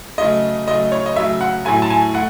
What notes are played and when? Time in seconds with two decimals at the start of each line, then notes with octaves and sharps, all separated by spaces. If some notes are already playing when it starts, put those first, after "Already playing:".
0.18 C#3 F#3 A3 D#5
0.67 C#3 F#3 A3 D#5
0.92 C#5
1.06 D#5
1.16 C#3 F#3 A3 E5
1.41 F#5
1.65 A2 F#3 A3 G#5
1.82 A5
1.90 G#5
2.14 A3 F#5